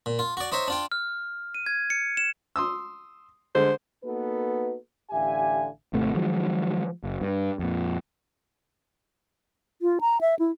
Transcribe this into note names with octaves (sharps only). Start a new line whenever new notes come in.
A#2
F4
F#4 D5
D#4 C5 C#5 E5 A#5
D4 F4 G5
F6
D#7
G#6
C#7
E7
C6 D#6 E6
D3 G#3 C5
A#3 B3 D#4 F#4 A4 B4
A1 D3 G4 E5 F5 G#5
G#1 C3 A3
D#3 F3 F#3 G#3
F#1
G2
F2 A#2
F4
A#5
E5
E4